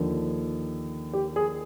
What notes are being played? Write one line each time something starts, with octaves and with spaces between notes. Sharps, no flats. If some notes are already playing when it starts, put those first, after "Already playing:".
Already playing: D#2 D3 F3
G4
G#4